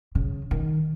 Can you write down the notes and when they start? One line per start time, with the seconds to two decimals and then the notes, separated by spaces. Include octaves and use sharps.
0.15 C#3
0.51 D#3